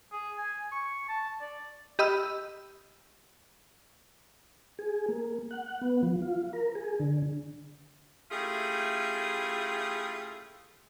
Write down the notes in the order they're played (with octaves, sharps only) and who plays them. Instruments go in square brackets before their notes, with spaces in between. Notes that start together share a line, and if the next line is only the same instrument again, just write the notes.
[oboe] G#4
G#5
C#6
A5
D5
[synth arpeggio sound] G4 D#5 B5 E6 F6
[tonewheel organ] G#4
A#3
F#5
B3
F3
F4
A#4
G#4
D3
[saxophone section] A3 C#4 E4 F4 G4 G#4